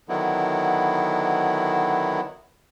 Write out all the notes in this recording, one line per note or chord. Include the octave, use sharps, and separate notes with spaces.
D3 D#3 F#3 B3 E4